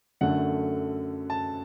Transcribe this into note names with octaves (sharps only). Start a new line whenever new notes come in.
F#2 D3 A3 F#5
A5